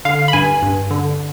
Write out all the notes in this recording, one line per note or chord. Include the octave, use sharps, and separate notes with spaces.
D3 F5
B5
G2 G#5
G2
D3